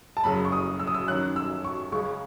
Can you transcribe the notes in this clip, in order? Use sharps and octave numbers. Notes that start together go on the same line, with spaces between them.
A5
F#1 F#2 C#3 F#3 B5
C#6
D#6
E6
D#6
E6
F#2 D#3 F#3 C#4 F#6
E6
C#6
C#2 C#3 G#3 C#6